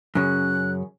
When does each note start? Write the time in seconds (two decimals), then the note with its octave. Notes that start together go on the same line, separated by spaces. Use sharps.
0.15 F#2 C#3 F#6